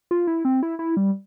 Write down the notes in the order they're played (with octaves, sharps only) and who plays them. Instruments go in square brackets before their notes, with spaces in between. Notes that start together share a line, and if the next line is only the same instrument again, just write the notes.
[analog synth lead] F4
E4
C4
E4
E4
G3